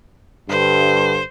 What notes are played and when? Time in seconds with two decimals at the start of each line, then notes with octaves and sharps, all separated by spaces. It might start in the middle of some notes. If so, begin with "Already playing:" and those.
0.50 G2 D3 C5